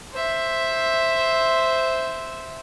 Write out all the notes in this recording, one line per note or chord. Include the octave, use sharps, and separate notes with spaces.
C5 E5